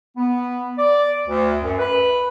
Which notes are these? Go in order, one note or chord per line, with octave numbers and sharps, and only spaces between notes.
B3
D5
D2
F#2
B4